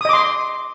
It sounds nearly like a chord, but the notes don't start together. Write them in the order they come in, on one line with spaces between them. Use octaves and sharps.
D#6 D#5 D6 C6